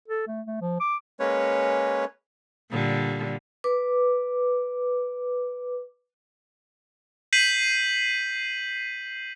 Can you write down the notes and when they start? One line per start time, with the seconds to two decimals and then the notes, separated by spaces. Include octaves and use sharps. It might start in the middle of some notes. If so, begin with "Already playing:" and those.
0.08 A4
0.27 A3
0.47 A3
0.61 F3
0.80 D6
1.20 G#3 A#3 C#4 B4 C#5
2.70 A#2 D3 G3
3.64 B4 D6
7.33 G6 B6 C7 D#7 F#7